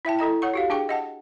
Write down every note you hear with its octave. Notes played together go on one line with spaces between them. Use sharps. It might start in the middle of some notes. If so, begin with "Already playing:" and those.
E4 E5 G5 A5
E4 A4 D#5 A#5
C#5 F#5 C#6
F#4 G4 F5
D4 G#4 G5 C#6
D#5 F#5 A5